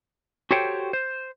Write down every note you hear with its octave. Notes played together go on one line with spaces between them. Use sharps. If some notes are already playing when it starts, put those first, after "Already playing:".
F#4 G4 A4 C5 C#5 G5
C5